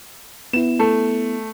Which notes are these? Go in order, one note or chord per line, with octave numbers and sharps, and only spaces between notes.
B3 E4 E7
A3